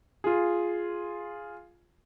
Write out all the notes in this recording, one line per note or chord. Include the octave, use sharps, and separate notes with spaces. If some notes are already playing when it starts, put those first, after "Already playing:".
F4 G#4